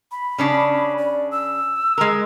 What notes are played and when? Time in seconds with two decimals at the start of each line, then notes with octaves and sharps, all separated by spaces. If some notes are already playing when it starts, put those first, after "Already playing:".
0.12 B5
0.38 C#3 C#4 D4
0.98 D5
1.31 E6
1.98 G#3 A#4